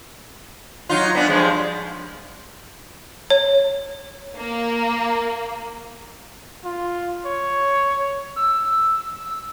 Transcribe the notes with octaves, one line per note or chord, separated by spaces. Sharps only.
F#3 D#4 F4
B3 C#4 D4
G2 F3 G#3
C#5
A#3
F4
C#5
E6